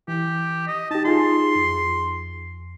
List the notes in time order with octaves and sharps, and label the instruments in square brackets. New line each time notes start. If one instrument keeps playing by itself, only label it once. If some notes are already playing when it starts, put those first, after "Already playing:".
[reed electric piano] E3 [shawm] G4
[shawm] D#5
[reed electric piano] D#4 G4 [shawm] A5
[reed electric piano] D#4 F4 G#4 [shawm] C6
[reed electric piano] F2